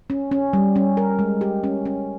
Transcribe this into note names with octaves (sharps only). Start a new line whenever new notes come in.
C#4
C#4
G3
C#4
A#4
G#3
G4
C#4
C#4